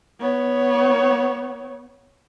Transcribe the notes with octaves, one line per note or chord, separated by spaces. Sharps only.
B3 C#5